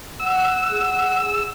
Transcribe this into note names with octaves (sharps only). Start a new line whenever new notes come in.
F#5 E6
G#4